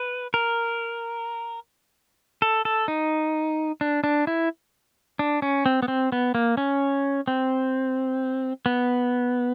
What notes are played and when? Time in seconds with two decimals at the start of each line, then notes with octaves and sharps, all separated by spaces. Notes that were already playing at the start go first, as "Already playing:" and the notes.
Already playing: B4
0.34 A#4
2.42 A4
2.65 A4
2.88 D#4
3.81 D4
4.04 D4
4.27 E4
5.19 D4
5.42 C#4
5.66 C4
5.82 B3
5.88 C4
6.12 B3
6.35 A#3
6.57 C#4
7.28 C4
8.66 B3